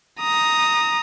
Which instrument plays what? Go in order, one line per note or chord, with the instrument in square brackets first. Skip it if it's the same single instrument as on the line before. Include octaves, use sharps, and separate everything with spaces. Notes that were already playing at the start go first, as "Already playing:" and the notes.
[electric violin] A#5 D#6